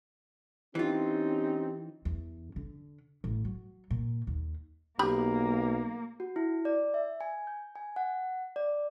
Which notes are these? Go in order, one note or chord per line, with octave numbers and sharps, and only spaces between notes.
E3 C4 C#4 D#4 F4 G4
E2
D3
A1
F#3
A#2
D#2
B1 A#3 G4 B5
F#4
E4
D5
E5
G#5
G6
G#5
F#5
D5